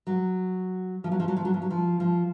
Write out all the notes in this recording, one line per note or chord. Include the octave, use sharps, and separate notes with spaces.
F#3
F3
F#3
F3
F#3
F3
F#3
F3
F#3
F3
F3